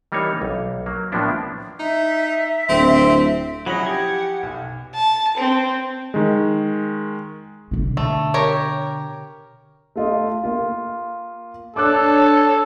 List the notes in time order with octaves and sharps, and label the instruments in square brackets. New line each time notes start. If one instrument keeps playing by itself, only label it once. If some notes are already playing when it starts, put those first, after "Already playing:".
[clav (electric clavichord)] E3 G3 A#3 D#4 C#5
B1
F#3 A#3
A2 F3 A#3 B3 D4 E4
[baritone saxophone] D#4 [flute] E5
[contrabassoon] D1 [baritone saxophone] C4
[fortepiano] F3 C#4 E4 [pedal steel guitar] F#3 G#4 D#5 [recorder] F#5 [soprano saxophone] B5
[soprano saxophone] G4 [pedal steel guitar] G#5
[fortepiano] B1
[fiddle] A5
C4
[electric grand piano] D#3 G#3
[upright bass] B2 D3
[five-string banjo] A3
G4 A#4 C#5
[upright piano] A3 F4 D#5
A#3 F4
[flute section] D4 C#5 [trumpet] A4 [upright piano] D6 E6 F#6